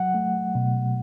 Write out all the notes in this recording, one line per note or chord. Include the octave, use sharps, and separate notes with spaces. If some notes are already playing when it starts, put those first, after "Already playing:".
Already playing: F#3 F#5
A3
B2